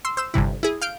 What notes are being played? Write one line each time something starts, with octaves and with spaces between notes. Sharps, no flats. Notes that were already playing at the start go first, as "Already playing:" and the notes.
C6 E6
C5 E6 E7
G1 G2 C3 E4
E4 G#4
F5 F6 G6 D7